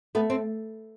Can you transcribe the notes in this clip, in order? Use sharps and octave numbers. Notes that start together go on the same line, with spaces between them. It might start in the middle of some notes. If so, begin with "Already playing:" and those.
A3 B3
C4